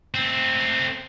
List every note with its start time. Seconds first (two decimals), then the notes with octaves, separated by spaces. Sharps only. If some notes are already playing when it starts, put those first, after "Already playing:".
0.14 A3 C4